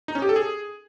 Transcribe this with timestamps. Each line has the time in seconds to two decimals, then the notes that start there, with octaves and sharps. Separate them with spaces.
0.08 D#4
0.15 C#4
0.22 G4
0.29 A4
0.36 G#4